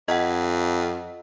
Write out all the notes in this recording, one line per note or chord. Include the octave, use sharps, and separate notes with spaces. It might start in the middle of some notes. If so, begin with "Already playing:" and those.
F2 D#5 F#5